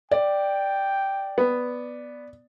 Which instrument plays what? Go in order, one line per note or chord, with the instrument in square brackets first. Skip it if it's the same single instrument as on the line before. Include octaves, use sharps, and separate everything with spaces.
[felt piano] D5 [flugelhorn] G5
[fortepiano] B3